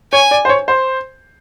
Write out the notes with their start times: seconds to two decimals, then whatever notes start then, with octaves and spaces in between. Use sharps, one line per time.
0.12 C#5 G#5
0.31 D5
0.45 C5
0.49 C#5
0.68 C5